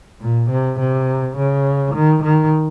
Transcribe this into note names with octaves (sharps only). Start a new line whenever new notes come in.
A#2
C3
C3
C#3
D#3
D#3